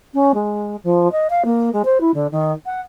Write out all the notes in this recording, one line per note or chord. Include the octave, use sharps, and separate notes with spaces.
C#4
G#3
F3
D#5
F5
A#3
G#3
C5
E4
D3
D#3
F#5